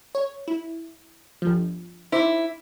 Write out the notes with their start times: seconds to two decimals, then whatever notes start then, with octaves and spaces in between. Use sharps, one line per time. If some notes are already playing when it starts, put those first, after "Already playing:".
0.15 C#5
0.48 E4
1.42 G1 F3
2.12 D#4 E4 C5 D6